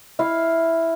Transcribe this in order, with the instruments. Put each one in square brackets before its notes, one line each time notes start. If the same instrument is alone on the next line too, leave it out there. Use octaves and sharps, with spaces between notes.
[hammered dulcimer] E4 F5